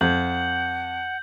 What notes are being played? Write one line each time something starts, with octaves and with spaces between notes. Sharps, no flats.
F2 F#5 G6 F#7